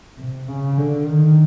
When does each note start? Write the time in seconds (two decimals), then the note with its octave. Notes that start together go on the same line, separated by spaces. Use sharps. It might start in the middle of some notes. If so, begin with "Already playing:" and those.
0.19 C3
0.48 C#3
0.77 D3
1.07 D#3